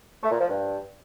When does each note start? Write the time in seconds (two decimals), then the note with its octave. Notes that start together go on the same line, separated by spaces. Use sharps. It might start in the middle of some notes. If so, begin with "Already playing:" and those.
0.22 A3
0.31 A#2
0.40 F3
0.48 G2